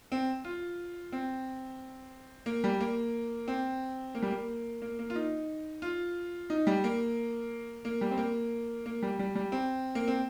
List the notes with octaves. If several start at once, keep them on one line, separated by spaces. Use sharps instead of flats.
C4
F4
C4
A#3
G3
A#3
C4
A#3
G3
A#3
A#3
A#3
F4
D#4
F4
D#4
G3
A#3
A#3
G3
C4
A#3
A#3
G3
G3
G3
C4
A#3
C4